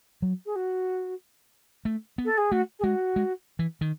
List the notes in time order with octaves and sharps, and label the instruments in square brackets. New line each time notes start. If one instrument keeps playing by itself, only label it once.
[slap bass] F#3
[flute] G#4
F#4
[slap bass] A3
B3
[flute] A4
G#4
[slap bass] A3 [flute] F#4
[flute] G#4
[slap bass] G#3 [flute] F#4
[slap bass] G#3
E3
D#3